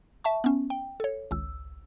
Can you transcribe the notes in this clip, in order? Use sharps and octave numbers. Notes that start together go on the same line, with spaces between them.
E5 A5 C#6
B3 C#4
G5
A4 C#5
G#1 C#2 E6